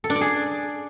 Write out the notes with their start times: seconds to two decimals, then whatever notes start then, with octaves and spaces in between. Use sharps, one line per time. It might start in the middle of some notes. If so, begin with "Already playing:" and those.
0.04 A4
0.10 D4
0.15 D5
0.21 G#4